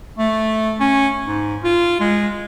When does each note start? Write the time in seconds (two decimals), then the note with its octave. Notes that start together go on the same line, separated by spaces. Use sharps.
0.18 A3
0.80 C#4
1.26 G#2
1.64 F4
2.00 G#3